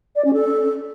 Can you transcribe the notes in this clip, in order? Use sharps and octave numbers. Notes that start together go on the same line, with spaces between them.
D5
C#4
A4